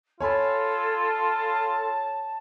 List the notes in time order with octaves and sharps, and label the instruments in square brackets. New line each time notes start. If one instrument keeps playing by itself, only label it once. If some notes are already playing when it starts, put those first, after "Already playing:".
[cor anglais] F4 [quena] A4 [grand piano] C#5 G#5 B5
[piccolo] A5